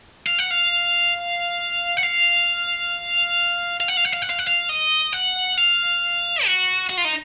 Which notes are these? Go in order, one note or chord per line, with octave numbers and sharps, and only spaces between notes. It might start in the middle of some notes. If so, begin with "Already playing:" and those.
F5
F#5
F5
F#5
F5
F5
F#5
F5
F#5
F5
F#5
F5
F#5
F5
D#5
F#5
F5
F#4
F#4
F4
D#4